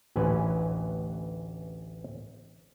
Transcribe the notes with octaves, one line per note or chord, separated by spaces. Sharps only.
A1 D2 E3 C#4 B4